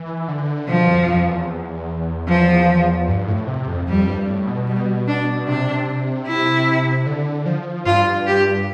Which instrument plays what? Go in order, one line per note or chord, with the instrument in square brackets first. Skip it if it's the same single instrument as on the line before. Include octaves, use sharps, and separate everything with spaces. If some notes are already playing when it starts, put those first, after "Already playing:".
Already playing: [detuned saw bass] E3
D3
[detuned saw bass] B2 [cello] F3
[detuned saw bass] F2
F2
E2
[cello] F3
[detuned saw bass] G2
A2
C3
F2
[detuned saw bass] F2 [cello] G3
[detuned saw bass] G2
A2
B2
[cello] G3
D4
[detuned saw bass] C3 [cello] D4
[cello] E4
[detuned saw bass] D3
F3
[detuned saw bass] G2 [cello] F4
[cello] G4